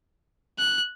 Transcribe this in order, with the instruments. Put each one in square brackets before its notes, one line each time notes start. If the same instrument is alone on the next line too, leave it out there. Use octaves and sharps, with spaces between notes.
[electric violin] F#6